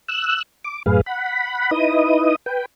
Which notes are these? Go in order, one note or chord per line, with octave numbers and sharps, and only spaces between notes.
E6 F#6
D6
F#2 A2 G#4 B4 F5
F#5 B5
D#4 E4 B4 D#5 D#6
B4 G5